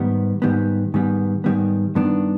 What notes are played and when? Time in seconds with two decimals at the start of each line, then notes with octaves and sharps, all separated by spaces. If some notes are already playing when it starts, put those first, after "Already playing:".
Already playing: G#2 D#3 G3 B3
0.42 G#2 D#3 G3 B3
0.94 G#2 D#3 G3 B3
1.44 G#2 D#3 G3 B3
1.95 G2 D#3 B3 D4